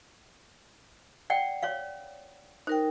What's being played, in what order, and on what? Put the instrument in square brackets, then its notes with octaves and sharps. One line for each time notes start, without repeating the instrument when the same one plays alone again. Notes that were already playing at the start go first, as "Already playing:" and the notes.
[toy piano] D5 F#5 G5
C#5 D5 F5
[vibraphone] D#4 A#4 G5 [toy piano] C5